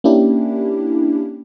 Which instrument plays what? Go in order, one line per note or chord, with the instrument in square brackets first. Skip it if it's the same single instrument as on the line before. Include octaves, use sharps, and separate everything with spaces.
[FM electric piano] A#3 C#4 D4 E4 G4